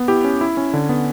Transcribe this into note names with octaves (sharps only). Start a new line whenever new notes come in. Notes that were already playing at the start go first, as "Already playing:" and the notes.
Already playing: B3
E4 G4
C#4
E4
C#4
D3
B3